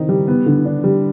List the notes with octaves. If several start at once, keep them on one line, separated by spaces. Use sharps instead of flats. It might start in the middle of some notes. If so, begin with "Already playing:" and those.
Already playing: D#3 C4 D#4
G3
B3
D3
D4
G3